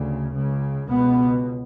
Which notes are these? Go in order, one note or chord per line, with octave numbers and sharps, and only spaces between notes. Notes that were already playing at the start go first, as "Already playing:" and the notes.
Already playing: D2 C#3
C#2 C#3
C#2 B2 B3